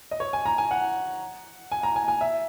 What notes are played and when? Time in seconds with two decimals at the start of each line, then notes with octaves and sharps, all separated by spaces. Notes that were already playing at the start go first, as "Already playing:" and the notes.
0.11 D#5
0.20 C#5
0.33 G#5
0.46 A#5
0.58 G#5
0.71 F#5
1.72 G#5
1.83 A#5
1.96 G#5
2.08 G#5
2.21 E5